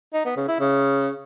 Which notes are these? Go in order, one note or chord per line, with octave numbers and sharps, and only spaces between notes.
D#4
B3
C#3
E4
C#3